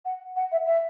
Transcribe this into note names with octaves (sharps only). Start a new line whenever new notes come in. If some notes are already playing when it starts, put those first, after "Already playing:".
F#5
F#5
E5
E5